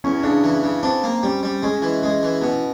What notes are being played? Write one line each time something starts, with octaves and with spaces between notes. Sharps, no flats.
E2 C#4
C#3 D4
E3
C#3
C4 D4
A#3
G3 C#4
G3
G#3 C#4
E3
G#3 C#4
E3
B2